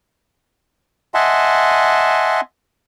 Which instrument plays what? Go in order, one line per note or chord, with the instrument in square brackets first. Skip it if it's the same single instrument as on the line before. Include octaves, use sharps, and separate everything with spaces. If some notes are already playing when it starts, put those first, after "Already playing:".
[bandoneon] D#5 E5 F#5 G#5 A5 C6